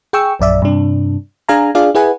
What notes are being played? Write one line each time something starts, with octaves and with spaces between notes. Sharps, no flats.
G#4 G5 C#6 E6
A#1 F#2 D5 E5
G2 C3 D4
D4 G#4 F5 G#5 A#5
D4 F4 G#4 D5 F5
E4 G#4 B4 F#5 G#5